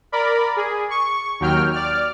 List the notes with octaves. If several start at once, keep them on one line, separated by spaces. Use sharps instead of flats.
A#4 D5 B5
G#4
C#6
D#2 F#3 G5 F6
D5 F6